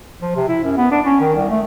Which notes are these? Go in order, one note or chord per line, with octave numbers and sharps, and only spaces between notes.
F3
C3
E4
F#2
B3
D4
C#4
D#3
C2
A3